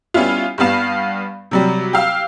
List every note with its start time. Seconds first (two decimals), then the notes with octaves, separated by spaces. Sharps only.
0.14 G3 B3 C#4 E4 F4
0.58 G2 G3 B3 F5 E7
1.51 C3 F#3 G3
1.93 G4 F5 E6